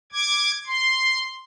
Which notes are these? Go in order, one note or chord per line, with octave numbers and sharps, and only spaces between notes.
D6 G#6
C6